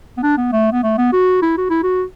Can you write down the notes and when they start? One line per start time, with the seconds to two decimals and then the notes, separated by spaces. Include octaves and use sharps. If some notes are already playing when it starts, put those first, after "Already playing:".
0.17 B3
0.23 D4
0.38 B3
0.52 A3
0.72 B3
0.83 A3
0.98 B3
1.12 F#4
1.42 E4
1.58 F#4
1.70 E4
1.83 F#4